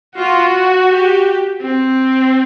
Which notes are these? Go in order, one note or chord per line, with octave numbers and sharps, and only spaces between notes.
F4 F#4
G4
C4